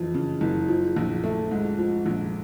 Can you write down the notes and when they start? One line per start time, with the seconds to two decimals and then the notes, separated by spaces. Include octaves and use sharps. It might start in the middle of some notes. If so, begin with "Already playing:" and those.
Already playing: F#1 F2 E3
0.14 C#3
0.41 F#1
0.69 F3
0.96 A#1
1.24 A3
1.51 G#2
1.78 F3
2.06 A#1